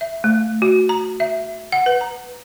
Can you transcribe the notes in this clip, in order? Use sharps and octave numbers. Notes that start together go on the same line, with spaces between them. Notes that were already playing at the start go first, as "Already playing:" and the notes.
E5
A3
F#4
A#5
E5
F#5
B4
A#5